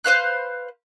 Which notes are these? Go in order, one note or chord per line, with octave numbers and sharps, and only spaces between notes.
B4 C5 F5 F#6